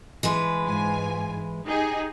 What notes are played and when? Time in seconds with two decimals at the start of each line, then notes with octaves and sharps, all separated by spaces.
0.23 E3 G#3 B4
0.65 G#2 F4 G#5
1.65 D#4 G4 G#4